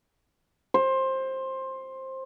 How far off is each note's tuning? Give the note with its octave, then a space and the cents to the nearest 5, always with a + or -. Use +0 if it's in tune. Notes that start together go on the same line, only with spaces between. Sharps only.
C5 +15